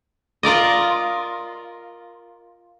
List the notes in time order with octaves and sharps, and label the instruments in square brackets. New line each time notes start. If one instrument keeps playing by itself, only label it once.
[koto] F4 A#4 D5 D#5